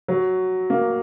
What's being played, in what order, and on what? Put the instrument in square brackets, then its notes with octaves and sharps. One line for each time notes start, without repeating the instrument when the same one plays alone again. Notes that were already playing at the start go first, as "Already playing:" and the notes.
[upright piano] F#3
A#3